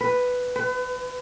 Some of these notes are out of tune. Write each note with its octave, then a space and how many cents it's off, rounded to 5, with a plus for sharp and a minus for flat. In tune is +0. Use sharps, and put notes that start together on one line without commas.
B4 +5
B4 +35